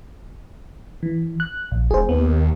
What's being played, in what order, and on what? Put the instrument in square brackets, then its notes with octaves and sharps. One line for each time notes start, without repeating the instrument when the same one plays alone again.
[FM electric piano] E3
F#6
A#1
[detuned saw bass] E1 [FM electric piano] G#4 C5
[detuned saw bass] D#2 [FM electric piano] B3